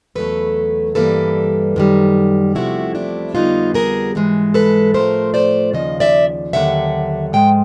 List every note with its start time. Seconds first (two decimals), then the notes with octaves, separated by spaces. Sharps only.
0.15 E2 C#3 F#3 A3 A4 B4
0.95 G2 E3 G3 A#3 A4 B4
1.76 F#2 D#3 G3
2.55 E2 C3 F3 A3 E4 F#4
2.95 D4 E4
3.35 F2 D3 G3 B3 D#4 F4
3.74 G#4 A#4
4.15 G#2 E3 G#3
4.54 A4 B4
4.94 A2 F3 A3 A#4 C5
5.34 C5 D5
5.73 D#2 C#3 F3 D#5
6.00 D5 E5
6.53 D#2 D3 F#3 E5 F#5
7.33 G#2 F3 G#3 G5